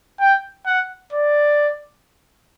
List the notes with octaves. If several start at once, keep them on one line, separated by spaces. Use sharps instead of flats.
G5
F#5
D5